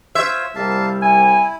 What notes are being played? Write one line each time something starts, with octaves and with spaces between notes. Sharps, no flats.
F4 C5 C#5 E5
C2 G3 A#3 F5 A5
E4 G#5